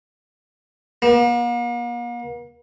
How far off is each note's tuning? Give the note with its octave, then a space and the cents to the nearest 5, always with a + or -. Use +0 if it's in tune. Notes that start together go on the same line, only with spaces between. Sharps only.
A#3 +45